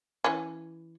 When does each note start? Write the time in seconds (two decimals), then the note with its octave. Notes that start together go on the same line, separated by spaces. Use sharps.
0.24 E3 C#4